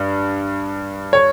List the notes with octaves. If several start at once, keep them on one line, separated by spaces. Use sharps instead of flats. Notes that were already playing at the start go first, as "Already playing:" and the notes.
Already playing: G2
C#5